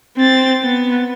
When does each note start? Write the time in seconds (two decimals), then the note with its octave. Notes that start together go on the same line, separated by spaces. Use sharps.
0.17 C4 A6
0.64 B3